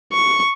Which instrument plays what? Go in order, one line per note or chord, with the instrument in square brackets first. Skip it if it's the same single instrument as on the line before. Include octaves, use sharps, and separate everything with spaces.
[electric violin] C#6